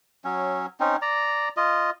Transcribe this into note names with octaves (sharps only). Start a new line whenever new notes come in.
F#3 C#4
C4 C#4 D#4
D5 A#5
F4 D#5